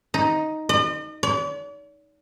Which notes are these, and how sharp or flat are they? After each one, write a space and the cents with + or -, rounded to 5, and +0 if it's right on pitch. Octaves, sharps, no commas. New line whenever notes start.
D#4 +5
D#5 -45
D5 -45